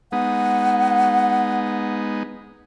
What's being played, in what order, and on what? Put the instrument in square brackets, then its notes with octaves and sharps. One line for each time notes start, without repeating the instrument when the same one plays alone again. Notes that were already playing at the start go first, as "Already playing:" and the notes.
[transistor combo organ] G#3 B3 D#4 [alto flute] F#5